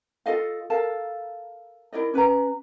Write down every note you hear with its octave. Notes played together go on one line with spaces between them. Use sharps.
F4 A4 D#5 F5
A4 A#4 F5 A5
E4 A#4 D5 D#5
C#4 B4 D#5 A#5